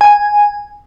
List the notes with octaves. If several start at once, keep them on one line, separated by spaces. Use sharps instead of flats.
G#5